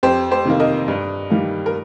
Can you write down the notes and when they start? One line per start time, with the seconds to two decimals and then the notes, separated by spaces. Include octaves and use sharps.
0.03 F2 G4 C5
0.31 G4 C5
0.45 C3 D#3 A#3
0.60 A#4 D#5
0.88 G2
1.30 D#3 G3 A#3
1.66 A#4